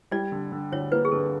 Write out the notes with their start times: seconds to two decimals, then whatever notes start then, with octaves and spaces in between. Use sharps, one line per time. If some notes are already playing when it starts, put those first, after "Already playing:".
0.11 G3 D5
0.32 D3
0.52 D3
0.72 D2 C#5
0.92 A#3 B4
1.05 G#4
1.12 D3 A4